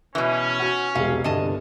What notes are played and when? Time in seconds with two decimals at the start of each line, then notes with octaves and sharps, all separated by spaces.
0.15 B2 E3 C#4
0.60 F#4 C#6
0.95 E1 C2 G#3 F5
1.24 G1 C2 D3 D#5 A5